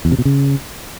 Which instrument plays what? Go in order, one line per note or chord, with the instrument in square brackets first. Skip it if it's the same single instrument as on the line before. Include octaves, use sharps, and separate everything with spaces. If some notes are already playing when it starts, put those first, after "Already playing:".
[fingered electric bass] E2
C3
B2
C#3